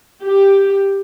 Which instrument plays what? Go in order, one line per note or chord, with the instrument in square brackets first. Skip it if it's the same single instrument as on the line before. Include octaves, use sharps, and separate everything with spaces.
[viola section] G4